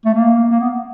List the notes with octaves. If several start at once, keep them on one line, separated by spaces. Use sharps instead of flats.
A3
A#3
A#3
B3